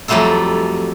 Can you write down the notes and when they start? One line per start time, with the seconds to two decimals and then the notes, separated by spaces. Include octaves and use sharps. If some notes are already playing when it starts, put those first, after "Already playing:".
0.08 F2 F#3 G3 A3 F4 A4